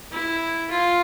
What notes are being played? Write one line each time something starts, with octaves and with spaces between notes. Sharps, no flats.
E4
F4